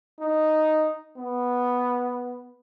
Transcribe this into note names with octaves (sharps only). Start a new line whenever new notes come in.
D#4
B3